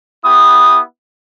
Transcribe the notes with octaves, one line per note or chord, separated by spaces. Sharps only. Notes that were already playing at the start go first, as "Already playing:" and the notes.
B3 E4 G4 D#6